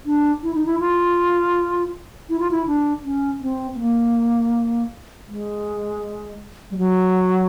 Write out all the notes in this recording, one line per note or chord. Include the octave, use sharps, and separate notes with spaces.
D4
E4
D#4
E4
F4
E4
F4
E4
D4
C#4
C4
B3
A#3
G#3
G3
F#3